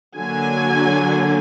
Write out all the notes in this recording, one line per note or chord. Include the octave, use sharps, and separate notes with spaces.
D3 F#3 A#3 D4 G#5